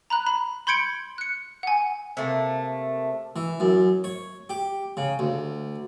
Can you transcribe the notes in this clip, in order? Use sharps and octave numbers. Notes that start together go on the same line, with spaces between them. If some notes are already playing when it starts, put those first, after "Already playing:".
A#5 B5 F#6
B5
B5 C6 G6 G#6 C#7 D7
F#6 C#7
F#5 G#5
C3 A3 A#3
E3
F#2
C#5
G4
C#3
D2